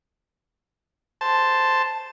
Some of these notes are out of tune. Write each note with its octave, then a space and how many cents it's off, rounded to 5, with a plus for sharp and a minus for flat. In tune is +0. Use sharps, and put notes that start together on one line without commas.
C5 +0 A5 +0